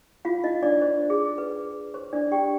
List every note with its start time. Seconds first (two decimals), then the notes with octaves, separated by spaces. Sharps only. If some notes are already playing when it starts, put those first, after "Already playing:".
0.25 F4 F5
0.44 D#4 D#5
0.63 D4 D5
0.81 C5
1.10 G#4
1.38 B4
1.94 C5
2.13 D4 D5
2.32 G4 G5